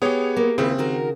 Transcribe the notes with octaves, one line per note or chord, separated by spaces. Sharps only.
B3 G4 G#4 C#5
A#3
D#2 C#3 C4 E4 B4
D#3 F#4 A#4